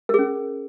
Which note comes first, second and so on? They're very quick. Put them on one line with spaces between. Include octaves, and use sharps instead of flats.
A#4 G#4 C#4